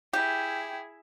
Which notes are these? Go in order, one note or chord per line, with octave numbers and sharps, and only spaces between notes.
E4 G4 G#4